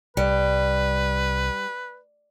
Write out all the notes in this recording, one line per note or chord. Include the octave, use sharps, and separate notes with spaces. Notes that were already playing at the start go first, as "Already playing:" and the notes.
C2 G3 B4